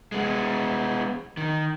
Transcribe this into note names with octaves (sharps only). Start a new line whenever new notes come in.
G#3 B3
D#3